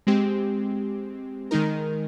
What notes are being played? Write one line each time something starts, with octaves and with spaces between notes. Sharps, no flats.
G#3 C4 G4
D#3 G#3 D#4 A#4